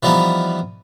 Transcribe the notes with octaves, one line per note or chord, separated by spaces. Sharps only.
E3 F3 G3 B3 D#4